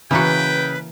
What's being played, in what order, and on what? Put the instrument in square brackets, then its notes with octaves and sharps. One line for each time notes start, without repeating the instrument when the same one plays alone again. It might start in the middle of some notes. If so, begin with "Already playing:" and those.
[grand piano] C#3 [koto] E3 A#3 F#4 [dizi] B4 [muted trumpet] G5